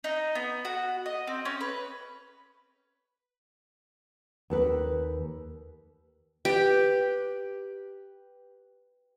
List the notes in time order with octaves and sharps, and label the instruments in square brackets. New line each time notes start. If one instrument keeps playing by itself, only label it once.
[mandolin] D#4
B3
F#4
D#5
C4
C#4
B4
[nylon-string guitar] D#2 A4 B4
[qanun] G4 [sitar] B4